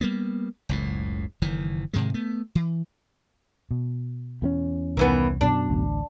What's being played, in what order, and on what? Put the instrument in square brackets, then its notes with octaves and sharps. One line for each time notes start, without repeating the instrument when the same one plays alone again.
[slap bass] G3 A#3 B3
F#1 C#2 A2
F#1 D#3 E3
G#2 C3 D#3 G#3
A3 B3
E3
[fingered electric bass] B2
[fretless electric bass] E2 A3 C#4
[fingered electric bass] C2 [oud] D#3 E3 B3
[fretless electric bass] F#2 B2 [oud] D4
[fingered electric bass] A1 D2